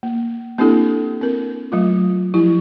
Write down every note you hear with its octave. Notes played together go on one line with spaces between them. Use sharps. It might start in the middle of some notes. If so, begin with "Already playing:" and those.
A#3
A#3 C4 D4 E4 G4 A4
C4 A#4
F#3 A3 F4
F3 E4 G4